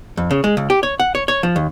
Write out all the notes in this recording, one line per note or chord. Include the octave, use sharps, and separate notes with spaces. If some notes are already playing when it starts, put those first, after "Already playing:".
F2
C#3
G#3
C#2
G4
C#5
F#5
C#5
C#5
F3
D#2